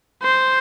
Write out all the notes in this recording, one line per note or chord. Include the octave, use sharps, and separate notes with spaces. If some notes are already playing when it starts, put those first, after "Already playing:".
C5